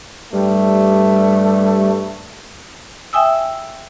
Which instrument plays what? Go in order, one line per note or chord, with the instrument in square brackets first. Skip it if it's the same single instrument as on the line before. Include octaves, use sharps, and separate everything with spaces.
[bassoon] G2 [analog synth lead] G3 [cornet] A3
[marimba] E5 G5 G#5 D#6 E6